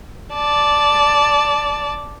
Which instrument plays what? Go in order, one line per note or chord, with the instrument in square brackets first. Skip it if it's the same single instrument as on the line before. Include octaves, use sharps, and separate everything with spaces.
[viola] D5 A5